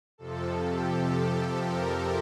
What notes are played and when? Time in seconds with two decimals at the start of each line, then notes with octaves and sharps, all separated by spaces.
0.18 F2 C3 F3 A4
0.65 G4
1.12 A4
1.59 A#4